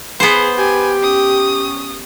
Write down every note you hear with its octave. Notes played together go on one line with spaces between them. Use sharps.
B3 G#4 B4 C5
G4 G#5
C#4 D#6